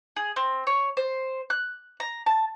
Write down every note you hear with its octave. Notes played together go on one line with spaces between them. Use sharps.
G#4
C4
C#5
C5
F#6
A#5
A5